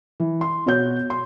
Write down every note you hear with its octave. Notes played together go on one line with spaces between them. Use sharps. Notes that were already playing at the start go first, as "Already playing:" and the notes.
E3
C6
B2 F#4 C#5 G6
C6